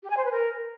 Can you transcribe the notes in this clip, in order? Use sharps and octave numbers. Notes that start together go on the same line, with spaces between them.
G4
G#5
C5
B4
A#4